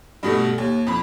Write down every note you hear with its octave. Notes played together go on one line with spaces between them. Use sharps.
G2 B2 A3
D#2
F2 B5